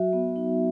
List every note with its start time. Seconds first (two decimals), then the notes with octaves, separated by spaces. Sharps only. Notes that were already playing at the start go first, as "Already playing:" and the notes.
Already playing: F#3 F#4 E5
0.13 B3
0.36 D#4